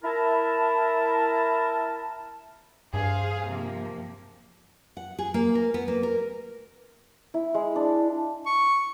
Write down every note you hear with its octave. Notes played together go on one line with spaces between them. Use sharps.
E4 A#4 A5
G2 G#4 C5 F5
C3 F3 A#3
F#5
G#4
A#3
A#4
B3
A#3
A#4
E4
G#3
D4
C#6